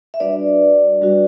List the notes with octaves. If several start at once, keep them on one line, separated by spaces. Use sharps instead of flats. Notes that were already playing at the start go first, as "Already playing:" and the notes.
E5
G3 D4 F#4 B4 D5
G3 D4 F#4